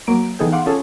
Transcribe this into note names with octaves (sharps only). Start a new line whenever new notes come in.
F#3 A#3 A#5 D7
E3 B3 D#4 G#4 A4 G5
F5 F#5 C6 D6
C#4 F4 G#4 A4 C#5